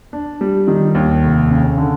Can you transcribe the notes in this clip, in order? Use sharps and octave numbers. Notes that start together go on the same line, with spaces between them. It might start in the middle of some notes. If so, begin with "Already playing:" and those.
D4
G3
D#3
D#2
F1
C#3
D3